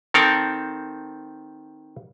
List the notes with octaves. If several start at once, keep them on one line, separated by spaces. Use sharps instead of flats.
D#3 C4 A4 A#4 A5